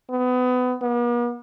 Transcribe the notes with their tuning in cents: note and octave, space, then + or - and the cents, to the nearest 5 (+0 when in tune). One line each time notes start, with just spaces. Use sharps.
B3 +25
B3 -45